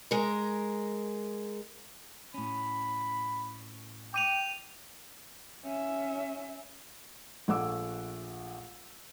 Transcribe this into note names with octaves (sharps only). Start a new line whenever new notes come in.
G#3 A#4
A2 C#4 B5
G5 D6 D#7 F7
C#4 E5
A#1 A3 F#5 D6 E6